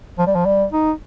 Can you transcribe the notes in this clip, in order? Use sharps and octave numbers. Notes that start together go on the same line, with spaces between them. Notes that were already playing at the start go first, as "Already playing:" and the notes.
F3
G3
F3
G3
D#4